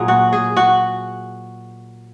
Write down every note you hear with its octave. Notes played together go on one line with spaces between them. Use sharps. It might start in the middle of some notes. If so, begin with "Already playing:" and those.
Already playing: A#2 F#3 G#4
F#4
G#4
F#4